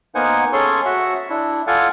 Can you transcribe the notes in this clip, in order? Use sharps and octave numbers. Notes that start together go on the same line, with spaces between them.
A#3 B3 D#4 C5 F#5 G#5
C#4 G#4 A4 C#5 C6 C#6
F#4 E5 F#5
D4 E4
F4 A4 D5 F5 F#5 G#5